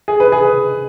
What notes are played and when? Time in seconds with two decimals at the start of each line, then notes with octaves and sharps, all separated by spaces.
0.08 G#4
0.20 B4
0.32 G#4
0.45 B4